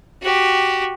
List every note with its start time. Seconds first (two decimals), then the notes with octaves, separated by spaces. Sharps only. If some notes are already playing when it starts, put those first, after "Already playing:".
0.22 F#4 G4